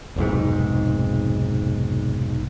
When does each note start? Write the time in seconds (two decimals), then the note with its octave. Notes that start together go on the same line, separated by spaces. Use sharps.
0.16 F1 B1 G#2